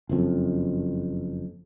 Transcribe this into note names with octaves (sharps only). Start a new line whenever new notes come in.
F#1 F2